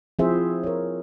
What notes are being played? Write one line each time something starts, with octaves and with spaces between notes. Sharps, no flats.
F3 C4 E4 G#4 C5 E5
A#4 C#5